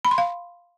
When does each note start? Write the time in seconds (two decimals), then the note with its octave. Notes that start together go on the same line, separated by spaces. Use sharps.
0.05 B5
0.11 C6
0.18 F5